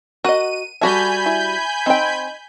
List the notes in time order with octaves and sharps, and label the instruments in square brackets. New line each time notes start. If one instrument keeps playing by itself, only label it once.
[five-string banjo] F#4 D#5 [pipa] A#4 F#5 [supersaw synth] D#7
[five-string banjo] G3 F#4 E5 [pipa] A4 [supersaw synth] G#5 B5 G6
[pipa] E4
[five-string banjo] C4 G5 [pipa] D#4